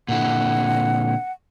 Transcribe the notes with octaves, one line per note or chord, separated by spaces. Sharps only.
A#2 D3 E4 F#5